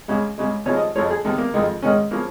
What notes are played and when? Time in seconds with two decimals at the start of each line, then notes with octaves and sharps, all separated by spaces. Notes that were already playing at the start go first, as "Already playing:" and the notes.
0.08 C#2 C#3 G#3
0.38 C#2 C#3 G#3
0.66 D#2 C#3 F3 G#3 C#5
0.76 D#5
0.95 F2 F3 G#3 C#5
1.10 G#4
1.25 D#2 D#3 G#3
1.38 A#3
1.54 F2 D#3 G#3
1.82 G#2 D#3 G#3 C#4
2.11 C#3 F3 A#3